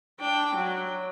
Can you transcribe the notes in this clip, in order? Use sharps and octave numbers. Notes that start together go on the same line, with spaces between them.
D4 G5
F#3